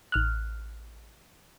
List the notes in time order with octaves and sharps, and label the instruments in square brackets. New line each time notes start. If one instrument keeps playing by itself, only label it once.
[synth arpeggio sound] A1 F6 F#6